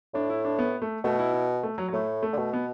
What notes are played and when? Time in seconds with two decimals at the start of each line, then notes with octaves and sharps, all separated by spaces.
0.14 A2 D4
0.30 E4
0.45 D4
0.59 B3
0.82 A3
1.04 B2 A3
1.19 E4
1.33 E4
1.63 A3
1.78 F#3
1.88 F#3
1.93 A2 A3
2.23 A3
2.33 D3
2.37 B2 A3
2.53 B3